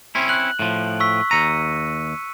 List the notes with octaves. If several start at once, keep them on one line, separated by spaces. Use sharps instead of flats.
C4 C#4 E4
F#6 F#7
A2 F3
C#6 E6 B6
D#2 A#5 E6 C#7 D#7